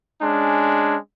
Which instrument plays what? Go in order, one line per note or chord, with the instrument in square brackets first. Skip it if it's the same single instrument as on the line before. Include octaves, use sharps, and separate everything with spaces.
[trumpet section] G#3 C#4 D4